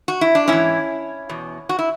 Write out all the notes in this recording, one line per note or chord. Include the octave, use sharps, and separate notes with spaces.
F#4
E4
D4
G#2 E3 C#4 E4
E2 B2
F#4
E4